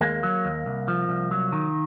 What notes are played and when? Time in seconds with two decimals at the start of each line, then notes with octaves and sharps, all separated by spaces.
0.01 D#2 G#3 A#3
0.23 F#3
0.45 D#2
0.66 C2
0.88 F3
1.09 C2
1.31 F#3
1.52 D#3